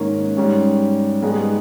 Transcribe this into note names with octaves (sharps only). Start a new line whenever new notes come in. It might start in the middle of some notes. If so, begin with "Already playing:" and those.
Already playing: G#2 D#3 A#3 C#4
G#2 G3 C#4
G#2 G3 B3 D#4 G#4